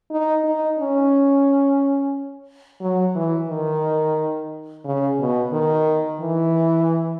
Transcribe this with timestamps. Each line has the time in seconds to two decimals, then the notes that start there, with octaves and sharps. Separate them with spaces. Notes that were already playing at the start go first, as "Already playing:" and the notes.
0.11 D#4
0.44 D#4
0.79 C#4
2.81 F#3
3.16 E3
3.49 D#3
4.85 C#3
5.20 B2
5.52 D#3
6.20 E3